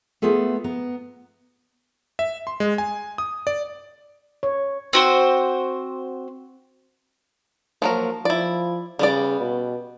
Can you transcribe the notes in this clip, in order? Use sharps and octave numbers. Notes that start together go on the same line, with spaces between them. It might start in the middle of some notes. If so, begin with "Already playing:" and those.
A3 B3 F4 G#4 A4
B3 A#5
E5
C6
G#3
G#5
D#6
D5
C#5
C4 F#4 C5
F3 F#3 A#3 A#4
F3 E4 D5
C#3 G3 B3 D5
B2